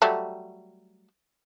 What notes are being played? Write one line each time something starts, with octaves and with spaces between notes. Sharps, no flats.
F#3 G3 A3